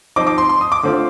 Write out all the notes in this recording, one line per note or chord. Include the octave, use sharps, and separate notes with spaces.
F3 C4 D#4 D6
D6
C6
C6
D#6
D6
D3 A3 C4 F4